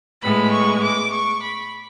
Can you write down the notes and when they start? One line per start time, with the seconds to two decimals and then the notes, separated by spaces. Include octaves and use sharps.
0.22 A2 G#3 B3 B5
0.52 C#6
0.82 D6
1.12 C#6
1.42 B5